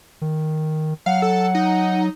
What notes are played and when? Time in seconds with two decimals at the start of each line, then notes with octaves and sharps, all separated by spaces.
0.21 D#3
1.06 F#3 F5 F#5
1.22 A4
1.55 D#4